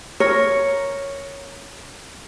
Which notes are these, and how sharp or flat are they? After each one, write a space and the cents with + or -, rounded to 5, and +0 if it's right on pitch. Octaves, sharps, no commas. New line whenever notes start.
A#4 +0 C#5 +0